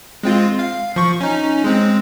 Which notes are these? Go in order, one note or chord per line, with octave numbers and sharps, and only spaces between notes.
G#3 C4 F4
F5
F3 C#6
C#4 D#4
G#3 C4